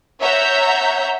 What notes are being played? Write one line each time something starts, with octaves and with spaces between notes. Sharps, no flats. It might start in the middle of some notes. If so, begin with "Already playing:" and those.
C#5 E5 F#5 A#5 G6